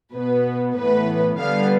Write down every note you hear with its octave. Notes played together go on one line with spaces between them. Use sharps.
B2 B3 B4
A2 E3 B3 B4
D3 G3 B3 F5